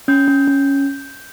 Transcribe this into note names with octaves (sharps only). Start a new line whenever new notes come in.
C#4 G6
C#4
C#4